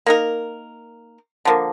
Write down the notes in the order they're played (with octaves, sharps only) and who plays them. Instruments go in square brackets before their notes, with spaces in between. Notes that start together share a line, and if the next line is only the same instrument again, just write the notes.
[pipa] A#3 D#4 A#4
D3 F3 A#3